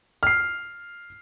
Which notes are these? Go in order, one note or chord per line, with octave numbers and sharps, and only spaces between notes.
F6 C7